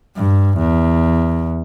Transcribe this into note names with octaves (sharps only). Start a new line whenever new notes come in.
G2
E2